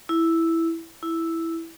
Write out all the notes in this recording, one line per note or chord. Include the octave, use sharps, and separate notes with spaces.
E4
E4